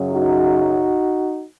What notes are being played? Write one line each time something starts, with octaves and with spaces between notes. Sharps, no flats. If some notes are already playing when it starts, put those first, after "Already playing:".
Already playing: F#2 C#3 F#3
D#4 F#4